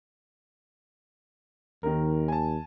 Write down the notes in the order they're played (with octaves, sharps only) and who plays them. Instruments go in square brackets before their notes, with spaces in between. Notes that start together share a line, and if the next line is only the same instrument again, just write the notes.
[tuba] D#2 [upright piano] D#3 A#4
[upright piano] G#5 A5